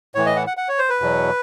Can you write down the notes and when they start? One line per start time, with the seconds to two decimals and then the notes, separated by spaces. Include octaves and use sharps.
0.15 A2 E3 C#5
0.26 D#5
0.36 F#5
0.47 F#5
0.57 F#5
0.69 C#5
0.79 C5
0.90 B4
1.00 E2 B2 F#3